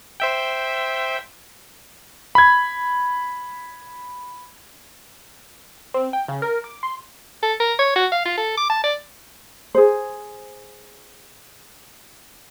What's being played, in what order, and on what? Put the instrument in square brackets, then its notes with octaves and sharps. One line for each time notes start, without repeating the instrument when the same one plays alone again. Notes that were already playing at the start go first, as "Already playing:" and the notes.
[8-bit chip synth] C5 E5 G5
[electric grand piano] B5 G#6
[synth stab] C4
G5
C#3
A#4
D6
C6
[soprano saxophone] A4
A#4
C#5
F#4
F5
F4
A4
D6
A5
D5
[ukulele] G#4 C5